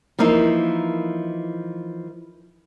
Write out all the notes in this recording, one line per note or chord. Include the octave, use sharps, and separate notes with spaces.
E3 F3 A#3 D#4 E4